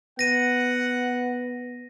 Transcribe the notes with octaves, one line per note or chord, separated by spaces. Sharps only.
B3 F#5 A#6 D#7